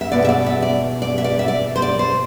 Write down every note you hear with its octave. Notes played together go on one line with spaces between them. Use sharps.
E5
E2 B2 G#3 D5
E5
D5
E5
D5
D5
E5
D5
E5
D5
C5
D5
C5